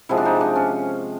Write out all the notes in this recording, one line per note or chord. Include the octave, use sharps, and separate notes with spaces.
C3 F3 G#3 E4
D4
D#4
D4
C#4